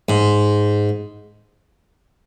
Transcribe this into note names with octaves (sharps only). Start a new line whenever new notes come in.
G#2